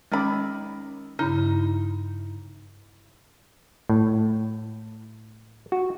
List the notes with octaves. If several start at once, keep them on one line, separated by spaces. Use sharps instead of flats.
D#3 G#3 C#4 B5 D6 E6 A6
G2 C#3 D#4 E4
A2
F#4